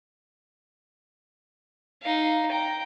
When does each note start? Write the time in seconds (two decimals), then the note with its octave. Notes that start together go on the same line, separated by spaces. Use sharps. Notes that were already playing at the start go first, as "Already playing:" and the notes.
2.02 D#4 F5
2.51 G5 A#5